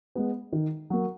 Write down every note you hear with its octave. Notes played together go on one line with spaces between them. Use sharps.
G#3 B3
D#3
F#3 A#3